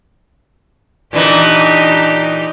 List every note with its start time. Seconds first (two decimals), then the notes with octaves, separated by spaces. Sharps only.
1.13 A#2 E3 D4 D#4 G4